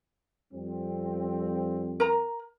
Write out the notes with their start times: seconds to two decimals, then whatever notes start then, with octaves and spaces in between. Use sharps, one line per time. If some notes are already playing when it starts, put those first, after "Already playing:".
0.52 F2 G3 C4
2.00 A#4 A#5